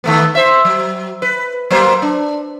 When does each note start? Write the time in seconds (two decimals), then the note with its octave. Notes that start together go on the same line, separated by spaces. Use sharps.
0.04 D#3 A3 B3
0.35 C5 E5
0.65 F#3
1.22 B4
1.71 F#3 A#3 C5
2.02 D4